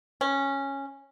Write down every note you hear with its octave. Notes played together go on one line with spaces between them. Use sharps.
C#4